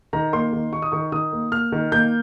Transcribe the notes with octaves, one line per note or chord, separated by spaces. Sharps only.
D#3 A#5
A#3 C6
D#3
D#3 C#6
D#6
D#3 C#6
D#3 D#6
A#3
A#3 F6
D#3
A#3 G6